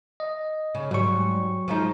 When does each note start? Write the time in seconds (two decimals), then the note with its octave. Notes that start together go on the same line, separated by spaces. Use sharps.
0.20 D#5
0.75 C#3
0.91 G#2 F#3 G3 C#6
1.68 F3 G#3 D#4